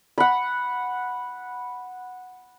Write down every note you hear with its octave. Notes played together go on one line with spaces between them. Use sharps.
F#5 B5